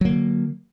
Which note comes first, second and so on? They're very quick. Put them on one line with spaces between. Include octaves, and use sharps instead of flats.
F#3 A#3 D3